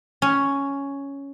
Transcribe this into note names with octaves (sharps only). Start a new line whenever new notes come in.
C#4